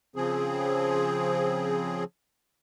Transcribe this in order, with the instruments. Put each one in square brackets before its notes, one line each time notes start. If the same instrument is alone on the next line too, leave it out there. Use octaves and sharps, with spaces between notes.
[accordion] C#3 F3 C4 G#4